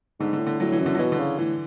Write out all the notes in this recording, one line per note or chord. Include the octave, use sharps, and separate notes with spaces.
G#2 D3
D3
A2
D3
A2 F#3
E3
F#2
D3
F#3
B2 E3
D3
C#3
A2 E3